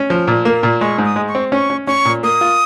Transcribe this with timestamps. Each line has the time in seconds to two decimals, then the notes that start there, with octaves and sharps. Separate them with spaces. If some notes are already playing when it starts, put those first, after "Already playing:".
Already playing: C#4
0.10 F3
0.27 A#2
0.45 A#3
0.63 A#2
0.81 G#3 C#6
0.98 G#2
1.05 D#6
1.16 G#3
1.28 C#6
1.35 C4
1.52 C#4 C#6
1.70 C#4
1.87 C#4 C#6
2.05 A#2
2.23 A#3 D#6
2.41 F4